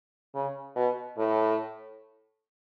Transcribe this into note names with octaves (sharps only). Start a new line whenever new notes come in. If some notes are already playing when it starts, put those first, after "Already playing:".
C#3
B2
A2